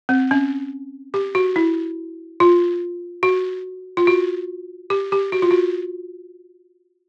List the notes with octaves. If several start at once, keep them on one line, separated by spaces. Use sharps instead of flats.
C4
C#4
G4
F#4
E4
F4
F#4
F4
F#4
G4
G4
F#4
F4
F#4